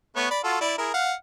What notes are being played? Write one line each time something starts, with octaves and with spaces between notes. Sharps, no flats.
A3 B3 C#5
D5 B5
F4 F#4 A4
E4 D5
E4 G#4 A#4
F5 F#5